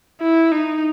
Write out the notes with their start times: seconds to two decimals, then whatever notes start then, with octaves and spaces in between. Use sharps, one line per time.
0.21 E4
0.52 D#4